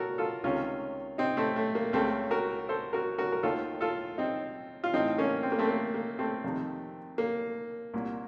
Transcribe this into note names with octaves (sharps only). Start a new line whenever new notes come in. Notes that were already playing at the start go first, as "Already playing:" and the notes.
Already playing: F#4 A4 A#4
F4 A4
C#2 C3 D#3 C#4 F4
C4 D#4
A3 C4
A3
A#3
C#2 C#3 A3 C4
F#4 A#4
A4 C5
F#4 A#4
F#4 A#4
A#4
D#2 D#3 F4 A4
F4 A4
C4 D#4
F4
A1 A2 C4 D#4
A#3 C#4
C4
A#3
A3 C4
A#3
A#3
A3 C4
F2 C3 D#3
A#3
C2 A#2